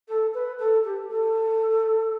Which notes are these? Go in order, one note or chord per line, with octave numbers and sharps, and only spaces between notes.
A4
B4
A4
G4
A4